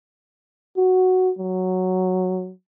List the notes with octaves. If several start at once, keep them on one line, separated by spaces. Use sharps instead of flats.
F#4
F#3